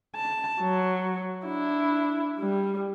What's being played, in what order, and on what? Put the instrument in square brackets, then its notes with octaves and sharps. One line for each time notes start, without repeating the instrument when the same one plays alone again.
[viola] A5
F#3
D4 E4
G3